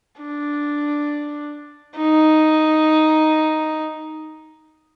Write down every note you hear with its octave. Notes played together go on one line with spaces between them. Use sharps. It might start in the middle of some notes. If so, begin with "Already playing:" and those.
D4
D#4